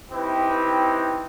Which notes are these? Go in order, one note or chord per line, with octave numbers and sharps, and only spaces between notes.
C4 D#4 E4 G4 B4